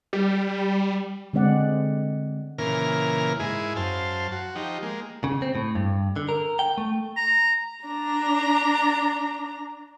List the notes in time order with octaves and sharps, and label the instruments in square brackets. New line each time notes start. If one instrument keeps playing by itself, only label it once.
[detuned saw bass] G3
[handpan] D3 G#3 C4 D5 F#5
[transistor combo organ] A#2 C#3 E3 A#4 F6
G#2 E4 G#4
F#2 C5 F5 A5
F#4
F3 D#4 G4
G#3 A#3
[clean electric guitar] C#3
C4
A2
G2
D3
A#4
G5
A3
[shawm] A#5
[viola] D4 A#5